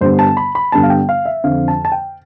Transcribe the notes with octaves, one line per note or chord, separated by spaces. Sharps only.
G2 D3 G3 B3 C5
A5
B5
B5
G2 D3 G3 B3 A5
F5
G5
F5
E5
F2 D3 F3 F5
A5
A5
G5